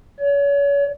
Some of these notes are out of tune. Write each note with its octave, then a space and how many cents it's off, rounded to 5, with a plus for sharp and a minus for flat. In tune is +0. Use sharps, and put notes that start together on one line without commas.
C#5 +35